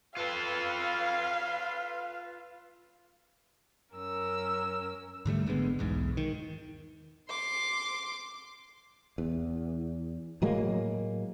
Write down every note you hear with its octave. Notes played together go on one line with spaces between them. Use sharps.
F4 A4 B4 F5
F#2 C#4 A#4 E6
G#2 D3 G3 A3
G#1 D3 G#3 B3
B1 E2 G#2
D#3
C6 D6
E2
A2 F#3 G#3 A#3